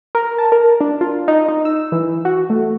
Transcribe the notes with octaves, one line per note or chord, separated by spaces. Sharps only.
A#4
A5
A#4
D4
F4
D#4
D#4
E6
E3
F#4
A3